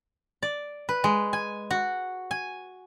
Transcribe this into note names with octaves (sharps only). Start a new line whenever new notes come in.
D5
B4
G#3
G#5
F#4
G#5